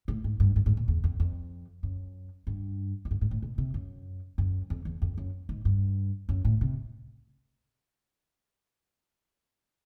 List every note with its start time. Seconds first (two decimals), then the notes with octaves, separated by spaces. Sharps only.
0.08 A2
0.24 G#2
0.40 G2
0.56 G2
0.66 G#2
0.77 A#2
0.88 E2
1.04 F2
1.20 F2
1.83 F#2
2.47 G2
3.05 G#2
3.11 G2
3.21 G#2
3.31 A2
3.42 B2
3.58 C3
3.74 F#2
4.38 F#2
4.70 F2
4.85 E2
5.02 F2
5.17 F#2
5.49 G#2
5.65 G2
6.29 F#2
6.45 A2
6.61 C3